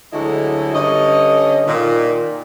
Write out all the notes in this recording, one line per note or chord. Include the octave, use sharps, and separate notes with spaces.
D2 D3 F#3 G#3 E4 D#5
G2 D3 C#4 D#5
A#2 D#3